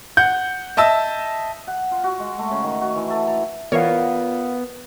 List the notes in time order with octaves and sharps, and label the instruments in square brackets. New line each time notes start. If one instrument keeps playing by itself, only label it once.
[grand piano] F#5 G6
D#5 E5 A5 E6
[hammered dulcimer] F#5
F4
F#4
G#3
A3
C#3
D#3
F#4
E3
A4
A#5
[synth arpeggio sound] E3 C#5 [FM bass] B3 [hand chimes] F4 D5 F#5 [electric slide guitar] A#4 F5